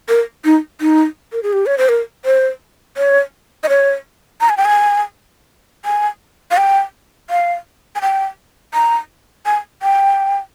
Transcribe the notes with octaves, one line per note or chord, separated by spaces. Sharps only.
A#4
D#4
D#4
A#4
G#4
G4
C#5
C5
A#4
C5
C#5
D#5
C#5
A#5
G#5
G5
G#5
G#5
F5
G5
F5
G#5
G5
A#5
G#5
G5